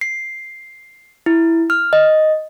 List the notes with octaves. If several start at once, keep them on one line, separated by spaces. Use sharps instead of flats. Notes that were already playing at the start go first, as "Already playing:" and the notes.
C7
E4
F6
D#5